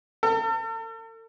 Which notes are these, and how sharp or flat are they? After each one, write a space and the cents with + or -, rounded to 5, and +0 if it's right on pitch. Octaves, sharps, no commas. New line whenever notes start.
A4 +45